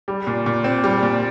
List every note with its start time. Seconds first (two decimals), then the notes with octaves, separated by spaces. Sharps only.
0.08 G3
0.27 A#2
0.46 A#2
0.64 C4
0.84 G3
1.03 A#2